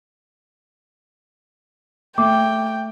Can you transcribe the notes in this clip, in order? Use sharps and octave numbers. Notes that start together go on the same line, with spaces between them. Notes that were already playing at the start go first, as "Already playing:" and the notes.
A3 G5 D6